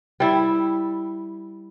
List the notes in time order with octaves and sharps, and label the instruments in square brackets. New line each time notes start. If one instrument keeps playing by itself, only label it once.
[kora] G3 E4